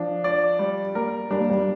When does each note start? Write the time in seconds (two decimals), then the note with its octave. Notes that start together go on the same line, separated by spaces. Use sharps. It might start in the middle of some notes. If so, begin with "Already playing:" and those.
Already playing: F3 D4
0.24 D5
0.59 G3
0.95 A#3 A#4
1.30 G3 D4
1.40 A#3
1.50 G3